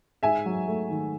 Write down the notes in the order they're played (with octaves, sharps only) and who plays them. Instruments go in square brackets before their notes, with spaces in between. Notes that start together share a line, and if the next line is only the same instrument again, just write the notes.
[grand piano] G#2 [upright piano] E5 G#5
[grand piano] F#3
A3
D#3